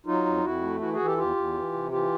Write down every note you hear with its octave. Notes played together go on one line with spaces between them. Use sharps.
F#3 D#4 F4
F2
F2 E4 F#4
A3
E3 E4 F#4
F#4 G#4
E3
G4 A4
E2 F4 G4
E2
E3
C3
E3 F4 G4